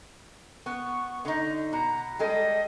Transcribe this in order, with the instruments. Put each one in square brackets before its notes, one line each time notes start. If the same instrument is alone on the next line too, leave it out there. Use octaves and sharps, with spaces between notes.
[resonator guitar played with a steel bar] B3 [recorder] C#6
[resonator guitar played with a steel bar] D3 D#4
[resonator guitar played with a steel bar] B2 [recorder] A#5
[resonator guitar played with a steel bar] G3 G#3 A4 [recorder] D#5